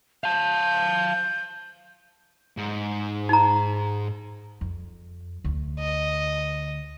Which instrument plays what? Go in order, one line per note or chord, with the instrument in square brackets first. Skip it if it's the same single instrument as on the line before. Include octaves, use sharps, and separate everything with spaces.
[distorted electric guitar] F5 A5 [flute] G6
[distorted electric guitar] G#2
[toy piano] D#4 A#5
[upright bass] F2
D2
[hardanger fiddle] D#5